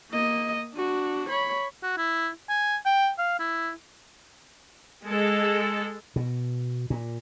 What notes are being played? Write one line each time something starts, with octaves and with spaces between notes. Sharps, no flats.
A#3 D#5
D4 F#4
C#5 B5
F#4
E4
G#5
G5
F5
E4
G#3 A4
B2
A#2